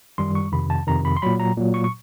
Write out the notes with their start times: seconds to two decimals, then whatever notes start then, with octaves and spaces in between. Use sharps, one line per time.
0.18 F#2 D#3 G3 C6
0.35 C#6
0.52 F2 C3 D#3 B5
0.70 A5
0.87 F2 C3 D#3 A#5
1.05 B5
1.17 C6
1.22 A#2 F#3 B5
1.40 A#5
1.57 A#2 F#3
1.74 C#6
1.84 C#6